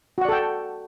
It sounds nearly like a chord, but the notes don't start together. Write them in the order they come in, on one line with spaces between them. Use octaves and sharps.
F#4 F#5 D5 A4 G5